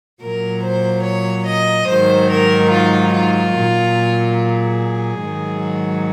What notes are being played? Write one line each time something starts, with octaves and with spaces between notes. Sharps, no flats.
A#2 F#3 A#4
C5
C#5
D#5
G#2 D#3 F#3 C5
A#4
F4
F4
A#2 F#3
G#4
G#2 D#3 F#3